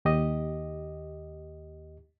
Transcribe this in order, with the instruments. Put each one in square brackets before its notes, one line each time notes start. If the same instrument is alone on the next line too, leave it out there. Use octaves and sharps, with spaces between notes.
[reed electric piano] D#2 G4 D#5